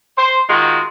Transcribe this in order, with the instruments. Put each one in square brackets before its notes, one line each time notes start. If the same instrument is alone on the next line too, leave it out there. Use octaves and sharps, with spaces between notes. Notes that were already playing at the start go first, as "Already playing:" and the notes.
[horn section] C5
D#3 G#3 F4 F#4